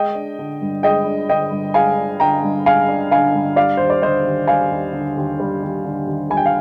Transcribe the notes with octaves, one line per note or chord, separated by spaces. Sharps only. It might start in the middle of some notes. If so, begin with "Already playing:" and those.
Already playing: G#3 D#5 G5
D4
D3
G2
G#3 D#5 G5
D4
D3 D#5 G5
G2
G#3 F5 G#5
D4
D3 G5 A#5
G2
G#3 F5 G#5
D4
D3 F5 G#5
G2
G3 D5 F5
D#2 C5
D5
D3 C5 D#5
D#2
G3 F5 G#5
D#2
D3
D#2
G3
D#2
D3
D#2
G3 G#5
G5
F5